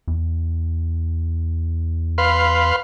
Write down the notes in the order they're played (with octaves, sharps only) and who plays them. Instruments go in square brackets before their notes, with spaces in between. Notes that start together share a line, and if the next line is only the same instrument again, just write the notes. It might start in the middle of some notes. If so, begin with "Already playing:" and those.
[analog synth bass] E2
[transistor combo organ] B4 F5 C6